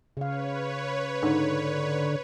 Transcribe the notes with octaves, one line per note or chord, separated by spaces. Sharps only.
C#3 B4 C#5 F5
G#2 D3